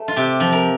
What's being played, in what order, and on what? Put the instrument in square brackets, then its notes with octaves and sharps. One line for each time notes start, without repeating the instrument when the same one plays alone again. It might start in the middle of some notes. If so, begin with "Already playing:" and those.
Already playing: [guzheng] A3
F4
C3 G4
F3
A#4